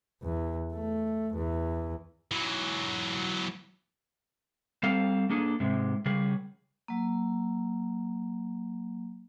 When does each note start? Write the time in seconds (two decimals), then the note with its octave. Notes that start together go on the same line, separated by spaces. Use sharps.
0.23 E2
0.74 A3
1.34 E2
2.31 E3 F#3
4.83 G3 C4 A4 F5
5.30 A#3 D4 G#4 A4
5.60 G#2 C3 G#3
6.06 C#3 G3 G#4
6.88 F#3 A#3